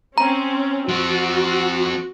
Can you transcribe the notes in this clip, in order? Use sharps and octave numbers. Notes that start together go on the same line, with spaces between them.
C4 C#4 A#5
F3 C4 F#4